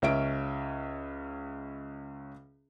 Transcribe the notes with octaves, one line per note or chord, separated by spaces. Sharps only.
C#2 C#4 E5 D7